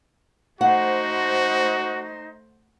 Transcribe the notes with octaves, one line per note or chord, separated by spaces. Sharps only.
A3 D#4 F#4 C5 F#5